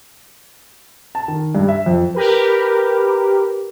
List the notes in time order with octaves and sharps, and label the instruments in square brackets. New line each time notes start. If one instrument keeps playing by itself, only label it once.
[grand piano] A5
D#3
G2
E5
F2
[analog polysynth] G4 A#4 B4